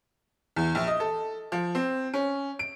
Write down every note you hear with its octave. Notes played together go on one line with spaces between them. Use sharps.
E2
A#1
D#5
A4
F3
C4
C#4
D7